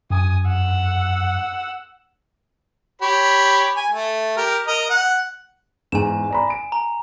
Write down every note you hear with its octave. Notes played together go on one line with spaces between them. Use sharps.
F#2 G#5 D#6
F#5 E6
G4 C#5 B5
G#5
A3
G4 A#4
A#4 D#5 A#5
F#5
E2 G#2 G#5 E7
D5 A#5 B5
D7
A#5